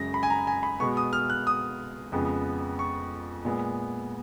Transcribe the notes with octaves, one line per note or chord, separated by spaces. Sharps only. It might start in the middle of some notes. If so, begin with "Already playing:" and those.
Already playing: F#2 C#3 G#3 A#6
B5
G#5
A#5
G#5
B5
B2 G#3 B3 C#6
D#6
F6
F#6
D#6
F2 C#3 G#3 B3
C#6
A#2 G#3 B3